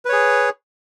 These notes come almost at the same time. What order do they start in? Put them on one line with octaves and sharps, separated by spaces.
B4 C#5 G#4